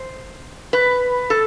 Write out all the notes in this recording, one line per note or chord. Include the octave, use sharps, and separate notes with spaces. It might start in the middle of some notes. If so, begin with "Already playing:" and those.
Already playing: C5
B4
A4